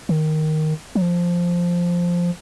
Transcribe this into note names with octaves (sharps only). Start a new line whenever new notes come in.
D#3
F#3
F3